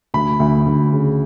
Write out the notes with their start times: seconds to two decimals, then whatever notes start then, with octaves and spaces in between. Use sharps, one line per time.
0.14 D2 B5
0.40 D2
0.66 D2
0.92 C#3